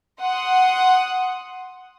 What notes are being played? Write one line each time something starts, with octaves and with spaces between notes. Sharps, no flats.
F#5 C6 D#6